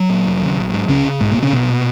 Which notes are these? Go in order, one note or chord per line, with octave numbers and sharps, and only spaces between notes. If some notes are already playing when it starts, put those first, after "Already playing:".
Already playing: F#3
A#2
F1
D#2 C#3
A#1
G#2
C#2 C#3 C#4
C#3
B1 G#2 G#3
A#2 A#3
B2
C#3 C#4
A#1 B2 B3
A#2